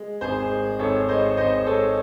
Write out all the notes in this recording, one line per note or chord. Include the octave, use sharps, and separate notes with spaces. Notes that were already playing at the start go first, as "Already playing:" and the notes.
Already playing: G#3
G#1 G#4 C5
G#3
G#1 A4 C#5
G#3 C5 D#5
G#1 C5 D#5
D#5
G#3 A4 C#5